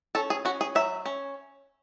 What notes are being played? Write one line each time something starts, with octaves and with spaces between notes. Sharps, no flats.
C#4 A4
G#4
C#4 F#4
G#4
F#3 E5
C#4